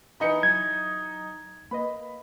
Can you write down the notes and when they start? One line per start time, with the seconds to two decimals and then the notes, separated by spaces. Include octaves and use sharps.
0.20 E3 D#4 B4 D#5 B5 C#7
0.43 F#3 G#6
1.71 A#3 B4 D#5 B5